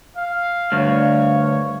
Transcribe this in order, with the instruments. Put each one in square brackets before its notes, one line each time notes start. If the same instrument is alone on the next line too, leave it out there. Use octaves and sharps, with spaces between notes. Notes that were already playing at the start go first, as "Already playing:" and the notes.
[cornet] F5
[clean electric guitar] D2 G2 [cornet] C#5 [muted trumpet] F5